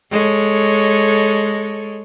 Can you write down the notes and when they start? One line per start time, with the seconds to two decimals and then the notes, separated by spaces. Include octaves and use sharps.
0.11 G#3 A4 C#5